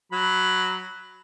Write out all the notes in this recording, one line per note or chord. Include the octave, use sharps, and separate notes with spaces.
F#3 B5